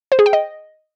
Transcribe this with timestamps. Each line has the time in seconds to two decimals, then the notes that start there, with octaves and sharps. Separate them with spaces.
0.12 C5
0.19 G#4
0.26 G5
0.33 D#5